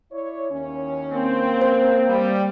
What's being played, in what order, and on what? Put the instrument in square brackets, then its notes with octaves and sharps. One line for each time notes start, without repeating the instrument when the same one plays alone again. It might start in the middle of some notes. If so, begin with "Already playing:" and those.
[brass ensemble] E4 C#5 D5
D#2 C#4
[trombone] A#3 [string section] C4
[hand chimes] C5
[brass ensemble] G3